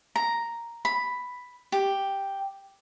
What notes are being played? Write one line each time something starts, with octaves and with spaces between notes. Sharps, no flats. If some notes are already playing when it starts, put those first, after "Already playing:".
A#5
B5
G4